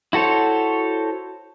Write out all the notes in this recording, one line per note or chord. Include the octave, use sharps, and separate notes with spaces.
E4 F#4 A4 C5 C#5